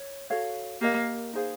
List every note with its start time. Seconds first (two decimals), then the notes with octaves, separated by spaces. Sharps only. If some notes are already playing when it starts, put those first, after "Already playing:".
Already playing: C#5
0.30 F#4 A4 C#5 F5
0.81 A#3 G4 A#4 D#5
1.33 D#4 G#4 C5 F5